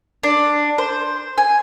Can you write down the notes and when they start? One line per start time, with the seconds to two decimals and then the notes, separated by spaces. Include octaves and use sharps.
0.23 D4
0.78 C5
1.38 G#5